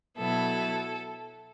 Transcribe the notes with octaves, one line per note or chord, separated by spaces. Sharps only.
B2 F#3 B3 E4 A4